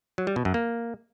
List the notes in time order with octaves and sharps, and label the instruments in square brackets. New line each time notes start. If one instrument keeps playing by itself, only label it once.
[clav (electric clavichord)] F#3
G3
B2
F#2
A#3